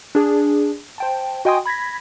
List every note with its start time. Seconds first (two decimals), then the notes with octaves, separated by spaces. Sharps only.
0.15 D4 G#4
0.98 C5 G5 A5
1.45 F#4 D#5 G5 G#5 C6 D#6
1.66 B5 G#6 A#6 B6